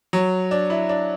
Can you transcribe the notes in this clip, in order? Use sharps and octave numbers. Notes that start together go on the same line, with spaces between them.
F#3
D4
E4
D4